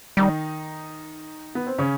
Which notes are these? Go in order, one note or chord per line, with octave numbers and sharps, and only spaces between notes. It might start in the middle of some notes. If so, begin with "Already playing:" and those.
D#3 G3 D#4
B3
C4
C#3 C#4